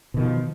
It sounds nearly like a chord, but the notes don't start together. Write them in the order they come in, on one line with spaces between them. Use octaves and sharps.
B2 D#3 F3